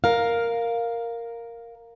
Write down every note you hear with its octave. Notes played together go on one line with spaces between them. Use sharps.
A#4 F5